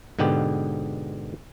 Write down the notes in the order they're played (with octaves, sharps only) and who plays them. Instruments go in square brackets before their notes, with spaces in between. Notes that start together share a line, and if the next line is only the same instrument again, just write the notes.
[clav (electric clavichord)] G#2 B2 D3 B3 G4